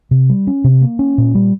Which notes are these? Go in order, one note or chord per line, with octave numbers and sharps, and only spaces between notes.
C3
G3
C#4
C3
A#3
C#4
A#2
G3